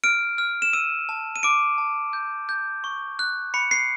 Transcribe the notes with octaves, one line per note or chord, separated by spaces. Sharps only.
F6 D7
F6
E7
E6 D#7
A5
D#7
D6 D7
A5
G6
G6
C#6
F#6
B5 C#7
C7